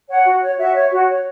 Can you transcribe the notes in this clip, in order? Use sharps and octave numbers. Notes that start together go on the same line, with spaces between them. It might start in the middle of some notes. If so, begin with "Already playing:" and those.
C#5 F#5
F#4
C#5
F#4 E5
C#5
F#4
C#5